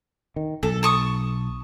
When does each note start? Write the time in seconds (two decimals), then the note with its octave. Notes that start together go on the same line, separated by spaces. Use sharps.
0.36 D#3
0.63 B1 A4
0.83 A5 C#6 D#6